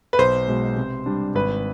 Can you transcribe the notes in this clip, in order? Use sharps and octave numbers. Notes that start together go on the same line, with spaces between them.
B4
B1 C5
B2 G#3
C3
G3 D4
G#1 B4